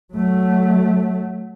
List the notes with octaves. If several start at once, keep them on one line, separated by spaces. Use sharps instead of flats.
F#3 A3